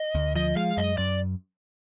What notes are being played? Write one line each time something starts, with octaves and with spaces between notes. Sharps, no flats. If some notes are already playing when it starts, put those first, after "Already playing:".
Already playing: D#5
D2
F3 D#5
G#3 F5
F#2 D#5
F#2 D5